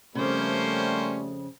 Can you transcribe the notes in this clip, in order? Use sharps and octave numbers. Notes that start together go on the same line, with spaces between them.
F2 C#3 G3 A3 A#3 C#4 C5